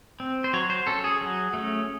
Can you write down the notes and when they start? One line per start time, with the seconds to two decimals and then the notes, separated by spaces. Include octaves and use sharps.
0.20 C4
0.44 C5
0.53 F#3 C#5
0.70 C5
0.87 C#4 A4
1.04 G#4
1.21 F#3
1.54 A3 C#4